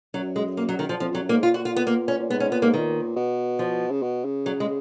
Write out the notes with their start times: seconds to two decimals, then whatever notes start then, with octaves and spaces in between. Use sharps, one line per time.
0.14 F#2 F#3
0.36 G#3
0.57 A#3
0.69 F#3
0.79 D#3
0.89 F3
1.00 F2 F3
1.12 F2 F#3
1.22 F#2
1.29 A#3
1.32 G#2
1.43 A#2 F4
1.54 F#4
1.65 F4
1.76 B3
1.87 A#3
2.08 C#4
2.20 A#2
2.30 G#2 B3
2.40 C#4
2.51 A#2 B3
2.62 G#2 A#3
2.74 A#2 D#3
3.16 B2
3.59 F3
3.91 C#3
4.02 B2
4.24 C#3
4.46 F#3
4.60 G#3